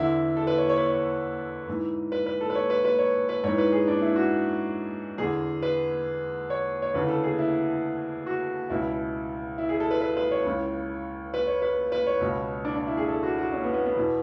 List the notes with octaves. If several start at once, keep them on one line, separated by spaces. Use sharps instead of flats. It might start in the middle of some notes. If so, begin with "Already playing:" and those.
Already playing: E2 D3 E4
A4
B4
C#5
C#5
B4
C#5
G#2 E3
B4
B4
A4
B4
C#5
B4
B4
C#5
B4
G#2 E3 C#5
B4
G#4
D4
E4
F#4
E2 D3 G#4
B4
C#5
C#5
D2 C#3 E3 B4
A4
G#4
E4
F#4
C#2 B2 E4
E4
G#4
A4
B4
B4
B4
C#5
C#2 C#3 E3
B4
C#5
B4
B4
C#5
C#2 B2
D4
D4
E4
G#4
A4
F#4
F#4
C#4
B3
B3
B3
E2 B2